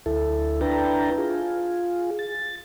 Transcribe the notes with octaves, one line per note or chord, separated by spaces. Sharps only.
D2 E4 A4
D4 E4 B4 G5 A5 A#5
F4 G#4
A6